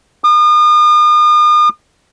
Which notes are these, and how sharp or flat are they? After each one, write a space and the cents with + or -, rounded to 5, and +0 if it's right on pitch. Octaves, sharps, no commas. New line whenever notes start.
D#6 -40